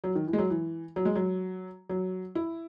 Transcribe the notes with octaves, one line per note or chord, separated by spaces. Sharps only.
F#3
D#3
E3
G#3
F#3
E3
F#3
G#3
F#3
F#3
E4